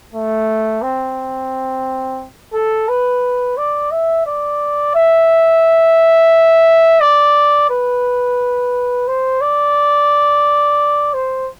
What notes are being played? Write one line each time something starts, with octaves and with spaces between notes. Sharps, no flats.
A3
C4
A4
B4
D5
E5
D5
E5
D5
B4
C5
D5
C5